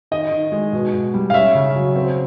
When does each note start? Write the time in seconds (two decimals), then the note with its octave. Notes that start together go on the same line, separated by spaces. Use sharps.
0.11 D#3 D#5
0.32 D#3
0.52 G#3
0.73 B2
0.94 B2
1.14 G3
1.30 F5
1.34 C#4 E5
1.55 C#3
1.75 F#3
1.96 C4